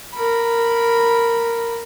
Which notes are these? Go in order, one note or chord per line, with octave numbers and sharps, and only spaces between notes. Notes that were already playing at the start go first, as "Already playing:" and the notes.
A#4 B5